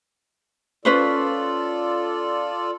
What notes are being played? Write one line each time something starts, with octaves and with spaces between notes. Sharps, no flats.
C#4 F4 A4 B4 C5 D5